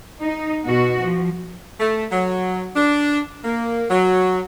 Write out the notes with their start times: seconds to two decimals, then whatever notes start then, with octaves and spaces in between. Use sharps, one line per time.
0.21 D#4
0.64 B2 F#4
1.01 F3
1.80 A3
2.12 F#3
2.75 D4
3.44 A#3
3.90 F#3